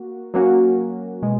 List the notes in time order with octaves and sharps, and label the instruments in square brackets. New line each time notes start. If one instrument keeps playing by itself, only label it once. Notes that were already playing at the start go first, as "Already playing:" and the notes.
Already playing: [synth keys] A#3 F#4
F#3 A#3 C#4 F#4
B2 G#3